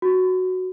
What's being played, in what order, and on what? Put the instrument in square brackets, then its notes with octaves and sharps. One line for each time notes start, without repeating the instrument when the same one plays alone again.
[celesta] F#4